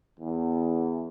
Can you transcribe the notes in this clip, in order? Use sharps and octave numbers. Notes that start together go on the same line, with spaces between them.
E2